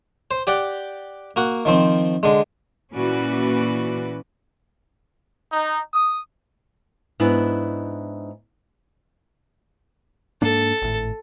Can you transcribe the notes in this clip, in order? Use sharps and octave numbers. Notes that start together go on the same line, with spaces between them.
C5
G4 D5 F#5 G5
A#3 F#4 F#5
D#3 F3 C4
D3 G#3
A#2 E3 C#4 F#4 B4 D5
D#4
D#6
G#2 B3 D4 E4
G#2 A#3 D4 A4
G#1 A2